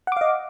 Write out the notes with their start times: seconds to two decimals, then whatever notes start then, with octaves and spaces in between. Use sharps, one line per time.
0.07 F#5
0.12 D6
0.17 F5
0.21 D#5